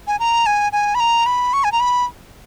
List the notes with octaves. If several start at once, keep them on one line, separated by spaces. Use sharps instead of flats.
G#5
A#5
G#5
G#5
B5
A#5
B5
C#6
G#5
A#5
B5